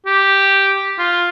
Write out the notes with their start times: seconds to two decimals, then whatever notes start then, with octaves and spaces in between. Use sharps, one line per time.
0.06 G4
0.99 F4